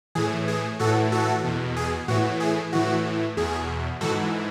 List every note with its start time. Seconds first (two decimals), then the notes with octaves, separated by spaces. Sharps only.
0.15 A2 E3 G#4
0.48 G#4
0.79 A2 E3 F#4 A4
1.12 F#4 A4
1.44 E2 B2
1.76 G#4
2.08 A2 E3 F#4
2.40 G#4
2.73 A2 E3 F#4
3.37 E2 B2 G#4
4.01 G#2 E3 F#4 A4